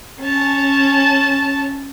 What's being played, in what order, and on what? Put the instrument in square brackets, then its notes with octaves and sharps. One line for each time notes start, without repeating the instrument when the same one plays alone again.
[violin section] C#4 A5